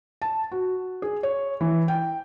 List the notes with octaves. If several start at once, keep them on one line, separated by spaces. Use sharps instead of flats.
A5
F#4
G#4
C#5
E3
G5